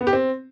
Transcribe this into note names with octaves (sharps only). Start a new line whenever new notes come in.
B3
G4
C4